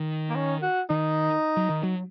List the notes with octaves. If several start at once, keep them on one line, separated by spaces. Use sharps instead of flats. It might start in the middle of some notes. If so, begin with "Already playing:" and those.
Already playing: D#3
A#3
C#4
F#4
D#3 D#4
F#3
D#3
F#3